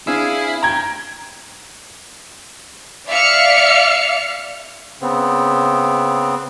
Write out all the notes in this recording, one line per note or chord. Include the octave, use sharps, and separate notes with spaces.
C4 D4 E4 G#4 F5 G#5
G5 A#5 G#6
D5 E5 F5 F6 C#7
C#3 B3 C4